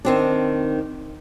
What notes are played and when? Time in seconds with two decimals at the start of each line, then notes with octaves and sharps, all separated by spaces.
0.05 D#3 C4 D4